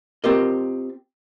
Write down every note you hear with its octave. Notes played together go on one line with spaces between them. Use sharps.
C4 F4 G4 A#4 D#5